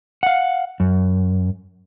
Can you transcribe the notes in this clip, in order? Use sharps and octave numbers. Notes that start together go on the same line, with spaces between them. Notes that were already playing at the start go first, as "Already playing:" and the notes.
F5 F#5
F#2